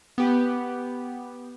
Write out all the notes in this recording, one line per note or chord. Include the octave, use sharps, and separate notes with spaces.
B3 G4